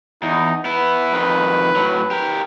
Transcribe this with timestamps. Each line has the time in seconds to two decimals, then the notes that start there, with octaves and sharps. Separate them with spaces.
0.23 E2 D#4
0.65 B3 E4 B4
1.13 F2 D#3
1.76 A2 F#3
2.11 G4 A#4